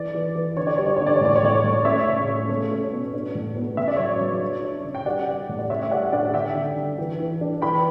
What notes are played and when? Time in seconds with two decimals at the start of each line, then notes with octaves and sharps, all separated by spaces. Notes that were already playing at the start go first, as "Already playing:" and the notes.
Already playing: E3 D5
0.15 E3
0.35 E3
0.57 D3 C#5
0.67 D5
0.77 G3 C#5
0.86 D5
0.97 D3 C#5
1.06 D5
1.16 C#5
1.21 A2 D5
1.36 C#5
1.43 A2 D5
1.55 C#5
1.64 A2
1.85 C#4 C#5 E5
2.06 C#3
2.28 C#4
2.49 A3
2.71 C#4
2.92 B2
3.13 D4
3.35 A2
3.56 B3
3.77 C#3 E5
3.88 D5
3.96 F#3 C#5 E5
4.21 F#3
4.41 D4
4.63 D4
4.84 C#3
4.95 G5
5.06 G3 D5 F#5
5.28 G3
5.49 A2
5.59 D5
5.70 C#3 C#5 E5
5.83 E5
5.91 G3 D5 F#5
6.12 D4 D5 F#5
6.34 D3 E5 G5
6.55 D3
6.76 D3
6.98 E3
7.20 E3
7.41 D4
7.62 E3 G5 B5